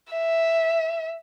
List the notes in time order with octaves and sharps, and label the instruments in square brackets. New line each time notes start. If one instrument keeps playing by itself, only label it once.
[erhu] E5